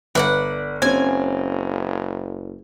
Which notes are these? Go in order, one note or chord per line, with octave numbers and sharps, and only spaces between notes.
G1 B4 D5 F#5
F#1 C4 C#4 G#5